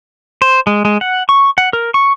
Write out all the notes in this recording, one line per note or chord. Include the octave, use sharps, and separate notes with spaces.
C5
G#3
G#3
F#5
C#6
F#5
A#4
C#6